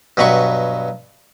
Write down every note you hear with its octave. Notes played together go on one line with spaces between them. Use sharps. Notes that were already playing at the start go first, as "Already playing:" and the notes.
G2 B2 F#3 B5 C#6